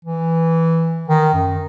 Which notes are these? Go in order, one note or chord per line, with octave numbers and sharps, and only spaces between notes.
E3
D#3
F#2